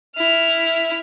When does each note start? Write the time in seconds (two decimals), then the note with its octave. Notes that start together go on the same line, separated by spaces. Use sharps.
0.16 E4 F6